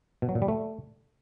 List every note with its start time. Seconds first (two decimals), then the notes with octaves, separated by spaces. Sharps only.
0.22 B2
0.29 F#3
0.35 A#2
0.42 G3
0.48 A3